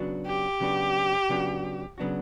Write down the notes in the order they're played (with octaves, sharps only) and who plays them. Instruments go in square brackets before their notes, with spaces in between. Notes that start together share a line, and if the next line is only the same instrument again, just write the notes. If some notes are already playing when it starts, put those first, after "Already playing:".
Already playing: [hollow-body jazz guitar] C#3 F#3 B3 D4 F#4
[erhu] G4
[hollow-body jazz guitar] C#3 F#3 B3 D4 F#4
C#3 F#3 B3 D4 F#4
C#3 F#3 B3 D4 F#4